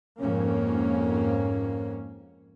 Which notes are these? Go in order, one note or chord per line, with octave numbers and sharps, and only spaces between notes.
F2 G#2 A#3 C#4